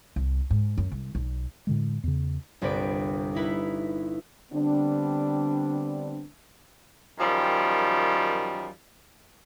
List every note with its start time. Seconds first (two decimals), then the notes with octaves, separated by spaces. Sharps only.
0.16 C2
0.50 G#2
0.78 F#2
0.91 C2
1.15 B1
1.67 A2 D3 G#3
2.04 E2 C#3
2.62 G1 C2 C4 B4 D5 D7
3.34 D#4 E4 B4
4.52 D3 G3 B3 C4 D4
7.19 F#2 D#3 F3 G3